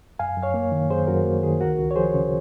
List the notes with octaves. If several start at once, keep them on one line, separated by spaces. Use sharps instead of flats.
F#2 F5 G#5
F#2
C#5 F5
A#3
D#3
F#2 G#4 C5
F#2 F#4 A#4
A#3
D#3 G#4
C#2 F#4 A#4
C#2
C#5
F3 G#4 C5
C#3